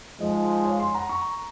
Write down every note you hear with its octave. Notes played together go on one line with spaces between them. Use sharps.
G#2 F3 G#3 D#5
C#5 F5
G#5 C6
F#5 A#5
A#5 C#6